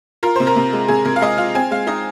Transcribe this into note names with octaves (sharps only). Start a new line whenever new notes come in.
F4 A#4
C3 C5
A#4
C3
G#3
C3 G#4
C3 A#4
F5
G#3 D#5
F4 F5
C4 G#5
G#3 F5
D#4 D#5